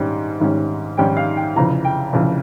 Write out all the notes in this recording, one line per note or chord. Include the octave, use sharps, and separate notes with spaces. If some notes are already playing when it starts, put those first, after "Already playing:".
Already playing: G#1 G#2 G3 C#4
G#1 G#2 G3 C#4
G#1 G#2 G3 C#4 G5
F5
G5
F1 F2 C#3 E3 A#5
G5
F1 F2 C#3 E3